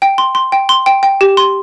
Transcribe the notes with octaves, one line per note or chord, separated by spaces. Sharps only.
G5
C6
C6
G5
C6
G5
G5
G4
C6